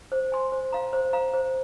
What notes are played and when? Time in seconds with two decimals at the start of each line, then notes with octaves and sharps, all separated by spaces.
0.12 C5
0.32 G#5 C6
0.52 C5
0.73 F5 A#5
0.93 C5
1.13 F5 A#5
1.34 C5